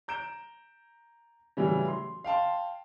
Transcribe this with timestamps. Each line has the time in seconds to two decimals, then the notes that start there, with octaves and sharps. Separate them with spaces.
0.08 A#5 G6 D7 E7
1.57 A2 C#3 E3 F#3 G3
1.88 C6
2.24 F5 G5 A5 C6